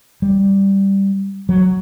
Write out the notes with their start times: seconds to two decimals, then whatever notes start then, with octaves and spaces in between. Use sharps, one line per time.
0.22 G3
1.49 F#3